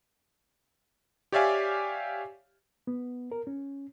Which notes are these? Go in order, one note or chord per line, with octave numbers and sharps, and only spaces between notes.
G4 C#5 D5 E5 F5 G#5
B3
A#4
C#4